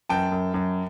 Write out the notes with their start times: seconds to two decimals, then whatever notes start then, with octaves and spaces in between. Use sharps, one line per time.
0.09 F#2 G5 A5
0.32 F#2
0.54 F#2